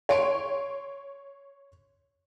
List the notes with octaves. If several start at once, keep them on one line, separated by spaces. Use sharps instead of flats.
C#5 C6 D7